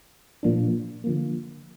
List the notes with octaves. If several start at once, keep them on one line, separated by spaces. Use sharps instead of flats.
A#2 F3 A#3 D4
D3 F3 A#3